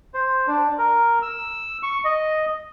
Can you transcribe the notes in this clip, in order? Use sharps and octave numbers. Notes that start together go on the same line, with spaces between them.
C5
D4
A#4
E6
C#6
D#5